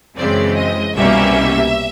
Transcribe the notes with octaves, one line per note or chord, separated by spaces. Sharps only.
F#2 C#3 E3 G#3 C4 D5
D#5
C2 B2 G3 A#3 C#4 E5